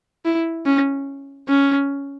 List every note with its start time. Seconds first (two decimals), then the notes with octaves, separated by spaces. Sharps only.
0.25 E4
0.66 C#4
1.49 C#4